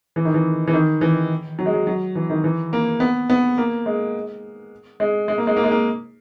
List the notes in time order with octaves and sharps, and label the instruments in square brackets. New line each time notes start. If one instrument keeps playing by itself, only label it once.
[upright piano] E3
D#3
E3
E3
D#3
E3
F#3
G#3
F#3
F#3
E3
D#3
E3
A#3
B3
B3
A#3
G#3
G#3
G#3
A#3
G#3
A#3
G#3
A#3